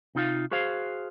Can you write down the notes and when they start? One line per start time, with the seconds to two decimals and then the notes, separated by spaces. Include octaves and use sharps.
0.15 C3 D#4 F4 F5
0.51 F#4 G#4 C5 F5